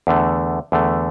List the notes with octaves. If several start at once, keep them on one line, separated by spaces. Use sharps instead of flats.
E2 D3 A3
E2 D3 A3